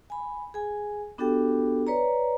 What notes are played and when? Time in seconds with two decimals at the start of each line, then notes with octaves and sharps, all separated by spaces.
0.10 G#5 B5
0.54 G#4 G#5
1.18 B3 D4 F#4 G4 A4 G5
1.87 B4 C#5 D5 A#5